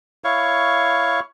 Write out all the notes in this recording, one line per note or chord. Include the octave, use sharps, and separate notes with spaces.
E4 C#5 F5 C#6